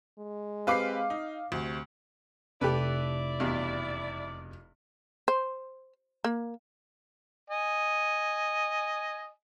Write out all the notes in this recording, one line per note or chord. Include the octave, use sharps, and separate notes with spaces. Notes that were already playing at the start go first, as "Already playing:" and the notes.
G#3
C4 G4 B4 F5 D6 C7
D#4
D2 C3
F1 E4 G4 A4 B4 D5
E2 G2 B2
C5
A#3
D#5 G#5